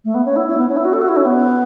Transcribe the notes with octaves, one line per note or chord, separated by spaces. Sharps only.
A3
B3
C#4
E4
E4
B3
C#4
E4
F#4
A4
F#4
E4
C#4
B3